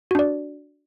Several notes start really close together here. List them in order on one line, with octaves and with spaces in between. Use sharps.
F#4 D4 D5